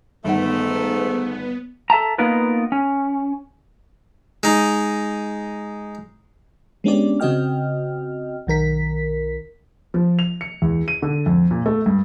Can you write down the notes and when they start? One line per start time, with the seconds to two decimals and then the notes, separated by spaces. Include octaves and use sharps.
0.24 G1 G#2 D#3 A3 B3 F#5
1.90 A4 E5 A5 A#5
2.18 A#3 B3 D#4 F4 A#4 B4
2.72 C#4
4.43 G#3 D#4
6.84 G#3 B3 C#4 D4 G4 D5
7.20 C#3 C4 F#4 D#5 G5 F6
8.47 B1 D#3 A#4 B6
9.94 F3
10.19 F7
10.41 C#7
10.62 E2
10.88 D#7
11.02 D3
11.26 F2
11.51 A#2
11.66 A3
11.86 G2